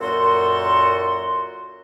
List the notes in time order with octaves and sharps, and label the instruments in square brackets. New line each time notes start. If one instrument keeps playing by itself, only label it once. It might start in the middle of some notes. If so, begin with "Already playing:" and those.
[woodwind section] F#2 A#2 F#4 A4 C6